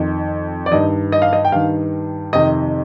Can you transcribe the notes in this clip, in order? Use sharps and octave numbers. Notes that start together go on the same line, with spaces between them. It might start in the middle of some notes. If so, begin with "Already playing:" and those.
Already playing: F2 D#3
D5
G2 D#3 D#5
D#5
F5
D#5
G5
G2 D#3 F5
F2 C3 D#3 D#5